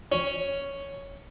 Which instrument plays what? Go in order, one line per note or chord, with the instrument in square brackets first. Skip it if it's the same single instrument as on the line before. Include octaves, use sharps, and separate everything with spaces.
[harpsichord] C#4